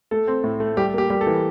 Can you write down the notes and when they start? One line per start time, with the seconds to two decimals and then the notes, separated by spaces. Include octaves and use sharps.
0.11 A3 A4
0.27 C4
0.44 A2
0.60 A3
0.77 G3 G4
0.94 A#3 G4
1.10 G3 G4
1.21 A4
1.27 E3